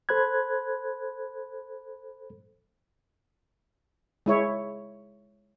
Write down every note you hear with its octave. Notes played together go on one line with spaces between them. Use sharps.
A4 C5 B5 F#6 G#6
G#3 E4 C#5